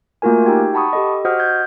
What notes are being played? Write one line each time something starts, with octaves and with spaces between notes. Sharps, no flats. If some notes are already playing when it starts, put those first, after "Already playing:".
A3 A#3 F4 F#4 A#4 G#5
D#4 F#4 G4 G5 G#6
F#5 A5 B5 C#6 D#6
G4 A4 D#5
F#4 C5 D#5 F#5 D#6 F6
G6 G#6